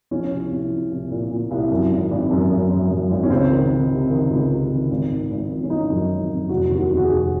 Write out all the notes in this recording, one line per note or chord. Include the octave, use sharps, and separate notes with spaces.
F3 C#4
C2
C2
F3
C2
A#2
A#2
C2
F#2
G#1
G#1
F#2
F#2
F#2
F#2
G#1
C#4
C#2 C4
D#3
D#3
C3
D#3
C#2
C3
D#3
G#1
G#1
G#1
F3
C#4
F3 D#4
F#2
G#1
F#2
F1 F#4
D#2
F#4
D#2
F#4
G#4
F1